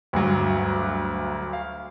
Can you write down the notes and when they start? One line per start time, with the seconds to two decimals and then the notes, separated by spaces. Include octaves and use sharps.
0.13 D2 G2 F#3
1.53 F5